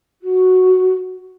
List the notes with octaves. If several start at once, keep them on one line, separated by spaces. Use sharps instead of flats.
F#4